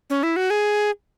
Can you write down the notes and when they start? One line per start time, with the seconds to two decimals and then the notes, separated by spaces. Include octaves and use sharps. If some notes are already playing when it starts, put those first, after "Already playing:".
0.10 C#4
0.23 E4
0.36 F#4
0.50 G#4